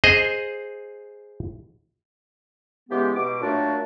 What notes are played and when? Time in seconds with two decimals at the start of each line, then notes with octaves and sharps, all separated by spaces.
0.04 G#4 C5 D#5
2.89 C#3 E3 G#3 B3 G4
3.16 B2 D6
3.41 A#2 F#3 A3 D4 F4 F#4